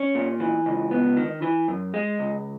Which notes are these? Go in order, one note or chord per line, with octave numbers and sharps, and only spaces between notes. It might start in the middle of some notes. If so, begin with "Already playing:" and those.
Already playing: C#4
A#2
E3
C#2
B3
D#3
E3
F#2
G#3
C#2